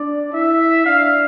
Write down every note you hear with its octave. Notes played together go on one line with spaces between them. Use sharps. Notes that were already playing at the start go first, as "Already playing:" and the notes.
Already playing: D4 D5
E4 E5
D4 F5